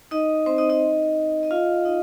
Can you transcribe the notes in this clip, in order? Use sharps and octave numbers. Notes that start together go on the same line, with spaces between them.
D#4 D#5
C4 C5
D#4 D#5
D#4 D#5
D#5
F4 F5
D#4 D#5